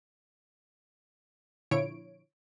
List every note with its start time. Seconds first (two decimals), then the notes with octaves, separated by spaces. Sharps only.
1.71 A#2 D3 F3 E4 C#5 D7